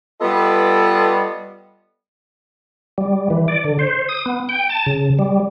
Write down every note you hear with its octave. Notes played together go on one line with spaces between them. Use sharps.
G3 B3 F4 A4 B4 D#5
G3
E3
D5
D3
C5
D#6
B3
G5
A5
C#3
G3